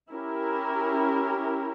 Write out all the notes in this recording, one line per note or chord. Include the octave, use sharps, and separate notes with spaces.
C#4 E4 G4 A#4